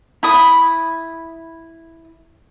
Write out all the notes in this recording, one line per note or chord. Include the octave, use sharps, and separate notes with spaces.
E4 B5 D#6